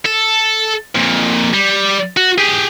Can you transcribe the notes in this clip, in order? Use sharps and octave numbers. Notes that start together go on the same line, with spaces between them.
A4
F2 A#2
G3
F#4
G4 G#4